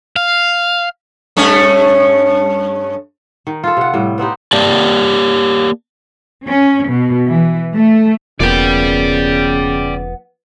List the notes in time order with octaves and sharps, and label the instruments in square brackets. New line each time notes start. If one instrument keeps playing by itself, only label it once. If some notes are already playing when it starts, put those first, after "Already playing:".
[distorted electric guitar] F5
[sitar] G2 A3 C#4
[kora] D#3
F4 A4
C3 F#5
A2 G3
B3 C4 D#4 G4
[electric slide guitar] A#3 G4 D5 A5
[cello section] C#4
B2
E3
A3
[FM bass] E1 [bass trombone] C#3 [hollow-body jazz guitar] F3 A#3 B3 [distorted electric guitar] D5 G5